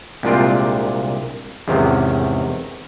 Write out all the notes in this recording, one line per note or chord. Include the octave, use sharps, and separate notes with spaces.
C2 A#2 G#3 D4 F4 G5
E2 G#2 C3 D#3 C#4